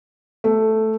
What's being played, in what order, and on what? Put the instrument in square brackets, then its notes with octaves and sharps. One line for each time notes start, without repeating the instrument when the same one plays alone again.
[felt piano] A3